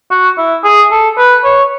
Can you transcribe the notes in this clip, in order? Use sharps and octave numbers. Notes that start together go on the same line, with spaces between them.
F#4
E4
G#4
A4
B4
C#5